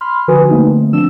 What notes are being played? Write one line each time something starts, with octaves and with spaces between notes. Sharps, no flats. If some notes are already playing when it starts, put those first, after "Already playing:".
B5 C6 F6
D3 F3 F#4 B4 G#5 D#6
D3 A3 A#3 C4 D#4
F3 C4 D4 E6 E7